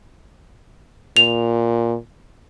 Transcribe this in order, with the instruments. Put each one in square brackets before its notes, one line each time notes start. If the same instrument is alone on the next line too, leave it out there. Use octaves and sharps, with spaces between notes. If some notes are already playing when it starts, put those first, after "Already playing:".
[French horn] A#2 [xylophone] F7